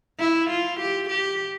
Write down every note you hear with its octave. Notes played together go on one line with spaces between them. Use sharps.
E4
F4
G4
G4